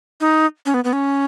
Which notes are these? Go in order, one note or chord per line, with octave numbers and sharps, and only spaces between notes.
D#4
C#4
B3
B3
C#4